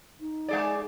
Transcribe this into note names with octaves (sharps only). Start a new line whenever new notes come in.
D#4
G#3 G#4 D5